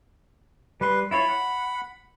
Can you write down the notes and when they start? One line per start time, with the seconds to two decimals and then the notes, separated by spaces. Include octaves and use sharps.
0.81 G3 B4 C6
1.11 E4 F4 C#5 B5
1.28 F#5